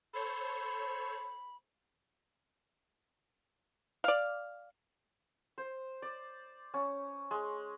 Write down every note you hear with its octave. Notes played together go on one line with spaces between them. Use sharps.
A4 C5 C#5 B5
D5 F5
C5
D5
C#4
G#3